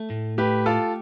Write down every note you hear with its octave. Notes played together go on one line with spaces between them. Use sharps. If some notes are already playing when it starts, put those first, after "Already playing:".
Already playing: A3
A2
A3 G4 B4
F4 G4 A4